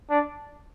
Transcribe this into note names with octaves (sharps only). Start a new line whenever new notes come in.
D4